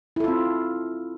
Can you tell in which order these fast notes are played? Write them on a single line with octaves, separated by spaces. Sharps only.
E4 A4 F4 C4